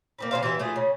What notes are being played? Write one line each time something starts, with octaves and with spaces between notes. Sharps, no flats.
A#3 C4 B4
C#3 A3 C5 F5
E3 G4 C5 E5
A3 F4 G#4
C#3